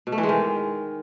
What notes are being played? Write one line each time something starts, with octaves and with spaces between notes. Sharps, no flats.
B2
A3
E3
G#3
D#3